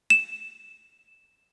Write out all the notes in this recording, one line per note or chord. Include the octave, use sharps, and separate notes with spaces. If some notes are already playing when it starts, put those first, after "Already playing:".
E7